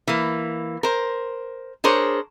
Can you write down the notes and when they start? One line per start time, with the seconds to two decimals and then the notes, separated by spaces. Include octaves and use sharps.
0.07 E3 A#3
0.83 A#4 C5
1.84 D4 G#4 A#4 C5 C#5